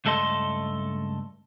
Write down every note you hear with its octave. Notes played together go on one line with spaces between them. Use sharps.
C#2 G2 A3 A4 D#5 C6